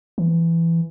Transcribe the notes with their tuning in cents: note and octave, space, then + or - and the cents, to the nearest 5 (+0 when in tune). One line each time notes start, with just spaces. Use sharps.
E3 +15